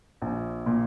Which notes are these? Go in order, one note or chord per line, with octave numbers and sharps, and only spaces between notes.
A#1
A#2